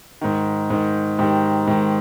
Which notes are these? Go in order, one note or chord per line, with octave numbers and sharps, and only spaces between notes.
G#2 D#3
G#2 D#3
G#2 D#3 G4
G#2 D#3